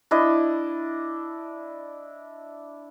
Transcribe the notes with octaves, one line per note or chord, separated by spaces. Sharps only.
D4 E4 D#5